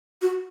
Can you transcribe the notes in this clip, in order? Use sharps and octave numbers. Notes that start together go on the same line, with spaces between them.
F#4